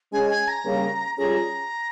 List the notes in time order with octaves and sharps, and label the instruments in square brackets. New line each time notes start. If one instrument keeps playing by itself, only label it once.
[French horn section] G#3 C#4 G#4 [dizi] G#5
[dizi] G#5
A#5
[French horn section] C#3 G3 A#3
[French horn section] G3 C#4 F4 G#4 [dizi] A#5